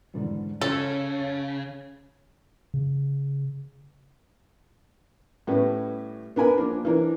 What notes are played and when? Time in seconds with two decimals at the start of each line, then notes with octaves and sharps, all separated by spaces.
0.14 E2 G#2 D3 G3
0.61 C#3 C#4 A4 C#5
1.19 C#5 A6
2.74 C#3
5.47 A2 G3 B3 C#4
6.36 B3 D4 A#4 G#5 B5
6.57 F3 A#3 D4
6.85 E3 D4 A#4